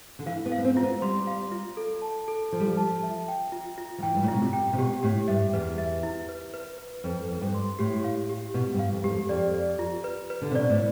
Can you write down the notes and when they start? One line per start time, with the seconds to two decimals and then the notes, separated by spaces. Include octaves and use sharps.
0.19 D3
0.26 E3 F5
0.46 B3
0.52 F5
0.58 B3
0.64 C4
0.75 C4 F4
0.83 B3
1.02 G3 C6
1.27 F5
1.52 F4
1.77 A4
2.02 A5
2.28 A4
2.52 F3 A4
2.60 G3
2.67 F3
2.77 A5
3.03 E5
3.28 G5
3.52 F4
3.78 F4
3.98 F3
4.03 E3 G5
4.15 G2
4.23 A2
4.28 B2 F4
4.41 C3
4.53 G5
4.73 C3
4.78 B2 G4
5.03 A2 G4
5.28 G2 E5
5.54 E2 B4
5.78 E5
6.03 E4
6.29 B4
6.54 B4
6.78 B4
7.04 F2 B4
7.29 F2 B4
7.42 G2
7.54 C6
7.79 A2 G4
8.04 F5
8.29 G4
8.54 B2 B4
8.73 G2
8.79 F5
8.92 F2
9.03 G2 G4
9.11 F2
9.29 F2 D5
9.54 D5
9.79 F4
10.04 B4
10.30 B4
10.42 D3
10.51 C3
10.55 B2 D5
10.70 A2